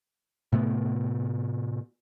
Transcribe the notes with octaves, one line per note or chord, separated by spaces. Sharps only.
A2 C3 A3 B3